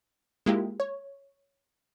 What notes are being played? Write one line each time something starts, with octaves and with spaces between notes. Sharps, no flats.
G#3 A#3 E4 F4 G4
C#5